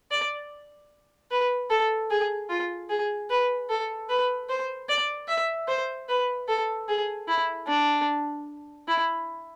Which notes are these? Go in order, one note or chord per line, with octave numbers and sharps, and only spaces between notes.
D5
B4
A4
G#4
F4
G#4
B4
A4
B4
C5
D5
E5
C5
B4
A4
G#4
E4
D4
E4